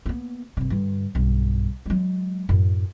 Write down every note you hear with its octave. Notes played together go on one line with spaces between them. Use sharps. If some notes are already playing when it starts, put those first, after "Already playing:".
A#3 B3
G1 C3
G2 D3
B1 G2
F#3 G#3
F#2 A2